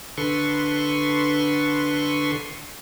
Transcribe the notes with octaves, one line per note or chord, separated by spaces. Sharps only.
D3 A4 B4 C6 C#6